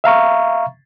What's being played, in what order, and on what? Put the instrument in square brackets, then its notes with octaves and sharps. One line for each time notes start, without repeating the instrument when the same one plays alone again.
[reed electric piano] E5 F5 A#5 C#6